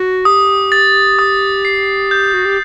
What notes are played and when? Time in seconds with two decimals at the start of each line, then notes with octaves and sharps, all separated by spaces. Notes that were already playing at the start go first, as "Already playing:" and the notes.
Already playing: F#4
0.25 G4 D#6
0.72 A6
1.19 D#6
1.65 C7
2.11 G6
2.34 F#4
2.45 G4